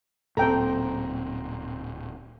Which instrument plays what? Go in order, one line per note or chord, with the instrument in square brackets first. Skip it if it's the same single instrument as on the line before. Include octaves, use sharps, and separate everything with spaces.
[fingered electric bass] D1 A#2 [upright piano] C4 A#5 [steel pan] A4 G5